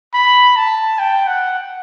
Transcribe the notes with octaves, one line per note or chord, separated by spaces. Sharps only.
B5
A5
G5
F#5